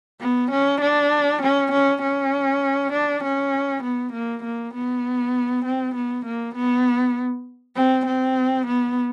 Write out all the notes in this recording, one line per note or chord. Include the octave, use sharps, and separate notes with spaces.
B3
C#4
D4
C#4
C#4
C#4
D4
C#4
B3
A#3
A#3
B3
C4
B3
A#3
B3
C4
C4
B3